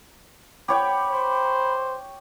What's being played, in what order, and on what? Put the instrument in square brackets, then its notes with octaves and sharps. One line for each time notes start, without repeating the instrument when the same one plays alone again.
[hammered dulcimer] G4 C#5 G5 [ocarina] B5
[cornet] C5